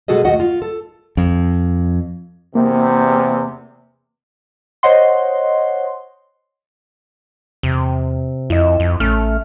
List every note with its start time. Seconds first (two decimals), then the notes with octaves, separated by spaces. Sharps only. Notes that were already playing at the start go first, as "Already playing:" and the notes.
0.08 B2 G#3 F#4 G#4 A4 D#5
0.25 D#2 A3 F#4 D#5 F#5
0.40 F4
0.62 A4
1.17 F2
2.55 E2 C3 A#3
4.83 C5 C#5 D#5 F#5 C6
7.63 E2 C3
8.50 F2 E4 D#5
8.80 F2
9.00 A1 A3 C#4 F6